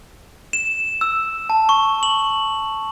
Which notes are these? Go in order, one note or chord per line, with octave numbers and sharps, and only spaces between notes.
E7
E6
A5
C#6
F#7